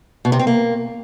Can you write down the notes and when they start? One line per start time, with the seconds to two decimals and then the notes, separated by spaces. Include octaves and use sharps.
0.25 B2
0.32 C3
0.39 C4
0.47 A#3